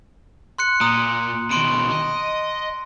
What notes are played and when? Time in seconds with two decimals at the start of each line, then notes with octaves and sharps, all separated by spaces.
0.58 C6 F#6 C#7
0.81 A#2 A#5 D#6
1.51 D#2 B2 C6 D7
1.92 D#5